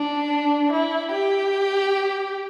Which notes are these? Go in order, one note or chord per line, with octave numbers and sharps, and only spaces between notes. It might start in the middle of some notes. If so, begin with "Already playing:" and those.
Already playing: D4
E4
G4